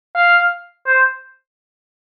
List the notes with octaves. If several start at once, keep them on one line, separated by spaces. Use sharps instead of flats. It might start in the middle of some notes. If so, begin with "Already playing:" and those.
F5
C5